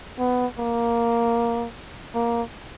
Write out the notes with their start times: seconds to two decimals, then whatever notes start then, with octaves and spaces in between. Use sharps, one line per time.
0.19 B3
0.58 A#3
2.15 A#3